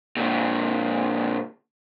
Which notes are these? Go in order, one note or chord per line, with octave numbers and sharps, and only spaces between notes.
A#2 D3